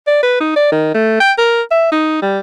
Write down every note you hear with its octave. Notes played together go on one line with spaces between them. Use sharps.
D5
B4
D#4
D5
D#3
A3
G5
A#4
E5
D#4
G3